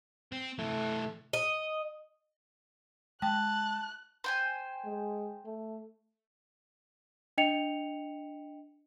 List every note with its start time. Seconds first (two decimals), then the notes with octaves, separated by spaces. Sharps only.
0.32 C4
0.59 C3 E3 A3
1.33 D#5
3.22 G#3 G5 A5 F#6
4.24 C5 G5 G#5
4.85 G#3
5.45 A3
7.38 D4 D#5 G5 C#7 F7